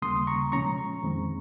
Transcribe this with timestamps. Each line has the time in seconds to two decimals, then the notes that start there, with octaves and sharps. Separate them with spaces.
0.02 D#2 C#3 G3 A#3 C6 D#6
0.27 A#5 C#6
0.52 A#2 F3 G#3 C#4 A#5 C#6
1.03 F2 D#3 G#3 C4